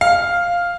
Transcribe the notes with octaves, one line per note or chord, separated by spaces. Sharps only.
F5